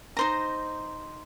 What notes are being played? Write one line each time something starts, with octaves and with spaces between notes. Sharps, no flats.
D#4 C5 A#5